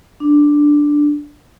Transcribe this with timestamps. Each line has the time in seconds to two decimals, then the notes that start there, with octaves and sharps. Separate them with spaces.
0.20 D4